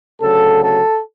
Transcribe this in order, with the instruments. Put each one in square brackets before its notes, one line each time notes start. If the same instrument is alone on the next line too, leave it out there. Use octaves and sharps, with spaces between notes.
[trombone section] D2 C#3 F#3 A4
A4